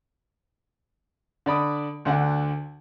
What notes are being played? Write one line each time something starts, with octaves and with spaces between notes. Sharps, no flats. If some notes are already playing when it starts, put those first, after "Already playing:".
D3 D5 B5 D#6
D2 D3 F#5